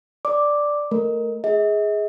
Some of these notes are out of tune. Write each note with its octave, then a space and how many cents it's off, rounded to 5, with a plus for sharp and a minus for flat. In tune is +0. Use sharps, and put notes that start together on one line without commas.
D5 +0 D6 +0
A3 +0 A#4 +0
G#4 +0 D#5 +45